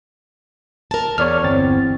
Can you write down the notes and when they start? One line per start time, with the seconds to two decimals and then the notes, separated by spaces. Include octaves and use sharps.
0.91 A#4 A5
1.18 E2 C#5 D5 F6
1.44 G1 C4 A6